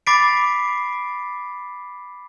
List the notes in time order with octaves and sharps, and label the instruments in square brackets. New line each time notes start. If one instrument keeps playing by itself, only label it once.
[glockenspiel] B5 D6 A6 B6 C7 D7